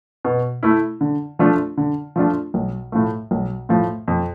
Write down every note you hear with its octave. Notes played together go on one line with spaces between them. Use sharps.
B2
A3 E4
D3
F3 A3 D4 F4
D3
F3 A3 D4 F4
B1
A2 F3 A3
B1
A2 F3 A3
F2